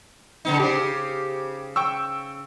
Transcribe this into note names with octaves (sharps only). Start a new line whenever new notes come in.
C#3 B3 D#4
C#3 G4 C5
G5 C#6 E6